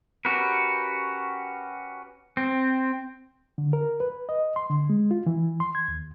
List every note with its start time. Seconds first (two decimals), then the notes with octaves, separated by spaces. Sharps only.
0.25 C#4 F#4 G4 A#4 B4
2.37 C4
3.58 D3
3.73 A#4
4.00 B4
4.29 D#5
4.56 C6
4.70 D3
4.90 G#3
5.11 F4
5.26 E3
5.60 C6
5.75 G#6
5.88 D#2